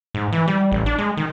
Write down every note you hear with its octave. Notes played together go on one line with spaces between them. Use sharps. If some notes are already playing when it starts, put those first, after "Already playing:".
G#2
E3
G3
A1
D4
G#3
D#3